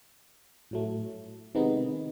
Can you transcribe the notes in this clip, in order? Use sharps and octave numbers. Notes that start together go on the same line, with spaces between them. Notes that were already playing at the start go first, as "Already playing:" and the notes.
A2 F#3 A3
C3 D#3 G#3 B3 D#4